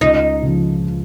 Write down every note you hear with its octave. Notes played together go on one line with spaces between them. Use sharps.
C#2 D#4
C#3 F3